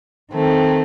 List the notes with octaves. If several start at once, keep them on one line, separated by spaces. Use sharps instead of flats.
D#3 A3 C4